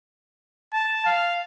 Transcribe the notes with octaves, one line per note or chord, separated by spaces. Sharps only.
A5
F5